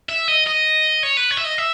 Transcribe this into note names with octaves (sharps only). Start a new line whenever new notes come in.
E5
D#5
D#5
C#5
B4
C#5
E5
D#5
E5